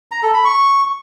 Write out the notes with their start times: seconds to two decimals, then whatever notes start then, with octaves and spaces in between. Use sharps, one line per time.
0.12 A#5
0.23 A4
0.34 B5
0.45 C#6